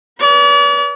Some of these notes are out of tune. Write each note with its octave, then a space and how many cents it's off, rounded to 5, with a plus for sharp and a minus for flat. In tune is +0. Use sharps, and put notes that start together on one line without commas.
B4 -25 D5 -45